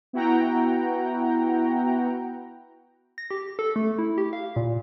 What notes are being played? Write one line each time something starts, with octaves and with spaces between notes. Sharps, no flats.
B3 E4 F#4 F#5 G5 A#5
A#6
G4
A4
A3
E4
G4
F5
A#2